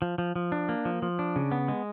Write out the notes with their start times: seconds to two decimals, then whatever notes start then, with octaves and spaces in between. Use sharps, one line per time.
0.02 F3
0.18 F3
0.36 F3
0.52 D4
0.69 A#3
0.85 F3
1.02 F3
1.19 D4
1.36 C#3
1.51 B3
1.68 G#3